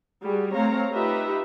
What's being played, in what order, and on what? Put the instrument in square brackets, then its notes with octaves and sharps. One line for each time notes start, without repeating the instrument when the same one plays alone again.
[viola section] G3 F#4 G#4
A3 C4 C#5 F5 A#5
D#4 F4 G4 B4 E5 A#5